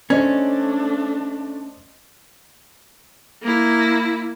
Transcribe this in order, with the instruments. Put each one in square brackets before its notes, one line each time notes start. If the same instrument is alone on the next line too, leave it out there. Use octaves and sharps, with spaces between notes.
[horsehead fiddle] A3 D4 [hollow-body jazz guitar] C#4 [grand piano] C5 D5 D#5
[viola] A#3 E4